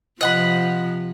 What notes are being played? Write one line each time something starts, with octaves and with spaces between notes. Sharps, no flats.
C3 F3 D#5 F#5 B5